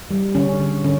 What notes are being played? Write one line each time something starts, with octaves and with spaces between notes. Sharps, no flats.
G3
D3 C#4
D3
D3 C#4